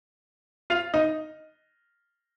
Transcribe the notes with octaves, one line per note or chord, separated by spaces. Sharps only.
F4 F5
D#4 D#5